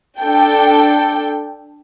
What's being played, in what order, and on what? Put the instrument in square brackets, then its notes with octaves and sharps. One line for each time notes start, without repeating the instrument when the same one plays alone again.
[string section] D4 A4 G5